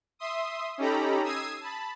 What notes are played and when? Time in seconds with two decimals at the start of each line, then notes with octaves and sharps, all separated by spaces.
0.19 E5 C6 D#6
0.78 C#4 D#4 G4 A4 A#5 B5
1.23 D#6 E6 G#6 C7 D#7
1.61 A5 B5